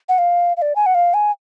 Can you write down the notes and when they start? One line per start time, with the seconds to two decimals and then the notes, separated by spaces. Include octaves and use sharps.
0.09 F#5
0.18 F5
0.57 F5
0.62 D5
0.76 G#5
0.86 F#5
0.95 F5
1.14 G#5